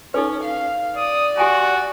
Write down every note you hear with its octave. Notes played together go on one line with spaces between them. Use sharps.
C#4 D#4 A4 B4
F5
D5 D#6
F#4 G4 G#5 A5